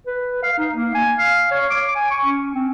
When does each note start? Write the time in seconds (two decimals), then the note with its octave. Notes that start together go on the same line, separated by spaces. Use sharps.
0.06 B4
0.43 F5
0.58 D#4
0.75 A#3
0.94 G#5
1.18 F5
1.51 C#5
1.70 D6
1.95 G#5
2.11 C#6
2.24 C#4
2.54 C4